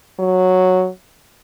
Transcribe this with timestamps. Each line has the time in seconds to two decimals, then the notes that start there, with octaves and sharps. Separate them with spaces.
0.19 F#3